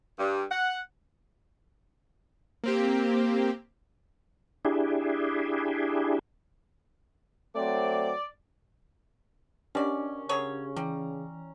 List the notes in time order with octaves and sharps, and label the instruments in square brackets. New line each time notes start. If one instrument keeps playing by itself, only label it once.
[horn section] G2
F#5
[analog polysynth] A#3 C4 G4
[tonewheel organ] D4 E4 G4 G#4
[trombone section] F#3 A3 C4 [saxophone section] D5
[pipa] B2 D5 [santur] C#4 [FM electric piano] D4 G4 A#4
[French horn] C#3 [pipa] F#3 G#4 C#5
[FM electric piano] E3 [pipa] G3 [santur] A#5